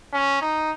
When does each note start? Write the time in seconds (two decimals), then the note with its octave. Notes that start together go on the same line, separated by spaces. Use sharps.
0.13 C#4
0.42 D#4